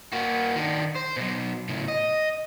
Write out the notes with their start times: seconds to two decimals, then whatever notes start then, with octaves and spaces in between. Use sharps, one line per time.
0.13 A#3 F#4
0.56 D#3 D4
0.95 C5
1.17 B2 F#3
1.69 A2 C#3
1.88 D#5